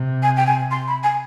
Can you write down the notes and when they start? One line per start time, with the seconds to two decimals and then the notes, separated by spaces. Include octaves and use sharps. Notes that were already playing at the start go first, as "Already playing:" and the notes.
Already playing: C3
0.23 G#5
0.37 G5
0.47 G#5
0.71 C6
0.88 B5
1.03 G#5